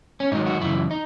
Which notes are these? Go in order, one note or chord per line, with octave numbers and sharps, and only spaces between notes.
C#4
G#2 D#3 F#3 D#4
F#4
F#2 C#3 E3 E4
D#4